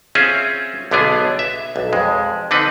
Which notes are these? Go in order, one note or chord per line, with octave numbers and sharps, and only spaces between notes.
C4 C#4 F4 G#4 E5
B1 D3 B3 D4 G#4
E5
B1
F2 G#3
D3 C4 D4 D#4 B4